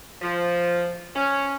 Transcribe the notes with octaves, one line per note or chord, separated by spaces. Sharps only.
F3
C#4